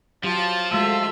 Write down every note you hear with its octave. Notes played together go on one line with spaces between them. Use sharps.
F3 F#3 F4 G4 A5
G#3 A3 F4 F#4 A4 E5